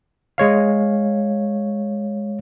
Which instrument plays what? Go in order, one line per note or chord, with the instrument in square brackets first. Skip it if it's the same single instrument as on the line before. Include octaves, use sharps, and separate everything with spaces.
[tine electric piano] G#3 C#5 F5